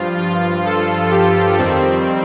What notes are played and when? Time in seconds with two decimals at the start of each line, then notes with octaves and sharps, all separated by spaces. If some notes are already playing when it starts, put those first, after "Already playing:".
Already playing: G2 F3 F4
0.18 F4
0.65 A4
1.11 G4
1.58 F2 D#3 G3 C4